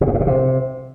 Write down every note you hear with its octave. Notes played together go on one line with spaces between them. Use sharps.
A#2
G#2
A2
B2
C3